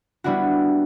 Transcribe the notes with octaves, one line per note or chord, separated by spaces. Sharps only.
G3 B3 D4 E4 F#4